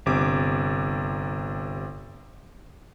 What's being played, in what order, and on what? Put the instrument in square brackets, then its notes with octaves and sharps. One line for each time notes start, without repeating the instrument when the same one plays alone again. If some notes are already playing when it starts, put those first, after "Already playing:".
[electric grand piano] G1 C3 D6